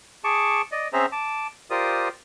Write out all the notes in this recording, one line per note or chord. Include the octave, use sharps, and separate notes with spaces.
G#4 A5 C#6 D6
D5 D#5
C4 C#4 G#4 C5 E5 A#5
A5 D6
F4 G4 A#4 C5 D5 D#6